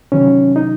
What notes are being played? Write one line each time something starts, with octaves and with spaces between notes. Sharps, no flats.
C3 D#3 F#3 C#4
D#4